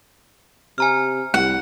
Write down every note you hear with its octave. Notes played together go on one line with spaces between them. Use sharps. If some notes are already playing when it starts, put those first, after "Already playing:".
C3 G#5 A#5 F6
C2 F#5